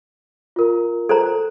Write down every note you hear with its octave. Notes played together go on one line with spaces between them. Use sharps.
F4 A#4
A4 C5 A#5